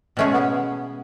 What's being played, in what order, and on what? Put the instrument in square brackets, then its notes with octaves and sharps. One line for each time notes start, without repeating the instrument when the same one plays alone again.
[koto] B2 G#3 C#4 G#4 [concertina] A3
[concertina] B3